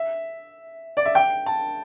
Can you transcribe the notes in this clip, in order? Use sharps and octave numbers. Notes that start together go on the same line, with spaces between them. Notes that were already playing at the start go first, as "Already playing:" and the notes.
Already playing: E5
D5
E5
G5
A5